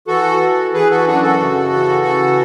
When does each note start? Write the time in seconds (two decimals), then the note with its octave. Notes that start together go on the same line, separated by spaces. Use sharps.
0.07 E3 F#4 A4
0.41 E3
0.73 E3 G#4 B4
0.90 F#4 A4
1.06 F#2 D4 F#4
1.23 F#4 A4
1.40 C#3
1.73 E3
2.05 C#3